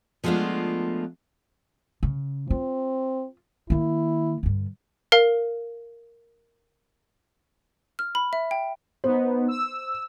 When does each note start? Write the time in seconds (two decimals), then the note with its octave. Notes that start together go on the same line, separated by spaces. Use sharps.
0.24 F3 G#3 A3 B3 D4 F4
2.03 C#3
2.50 C4 F4
3.70 D#3 A#3 E4
4.43 G2 D3
5.12 A#4 F5
7.99 F6
8.15 B5
8.33 E5
8.51 G5
9.04 B3 D#4 C5
9.48 E6